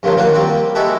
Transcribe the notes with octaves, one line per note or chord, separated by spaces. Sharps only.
G2 A#2 D3 F3 F#3
D#3 A#3 F4 F#4
G3 A#3 C4
G#3 E4 F#4 G4 A4